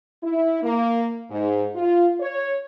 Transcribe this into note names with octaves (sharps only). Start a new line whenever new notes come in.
E4
A#3
G#2
F4
C#5